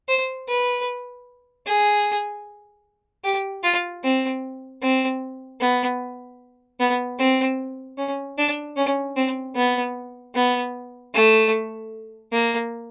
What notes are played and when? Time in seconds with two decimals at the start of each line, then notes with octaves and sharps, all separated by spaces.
0.09 C5
0.48 B4
1.66 G#4
3.24 G4
3.63 F4
4.04 C4
4.82 C4
5.61 B3
6.80 B3
7.19 C4
7.98 C#4
8.38 D4
8.76 C#4
9.17 C4
9.56 B3
10.35 B3
11.14 A3
12.32 A#3